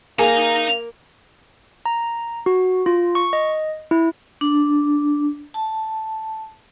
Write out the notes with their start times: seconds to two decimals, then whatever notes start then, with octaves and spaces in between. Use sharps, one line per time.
0.19 A#3 D#4 G#4 F5 A#5
1.86 A#5
2.46 F#4
2.86 F4
3.15 C#6
3.33 D#5
3.91 E4
4.41 D4
5.54 A5